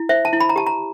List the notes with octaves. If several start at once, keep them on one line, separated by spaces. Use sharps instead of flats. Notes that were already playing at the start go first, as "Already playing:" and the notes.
Already playing: E4
C5 E5
A5
E4
B5
A#5
G4 A5
A#5